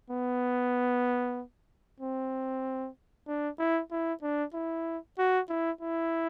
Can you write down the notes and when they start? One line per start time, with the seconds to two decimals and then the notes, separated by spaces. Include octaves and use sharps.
0.10 B3
2.00 C4
3.27 D4
3.59 E4
3.91 E4
4.22 D4
4.54 E4
5.18 F#4
5.49 E4
5.81 E4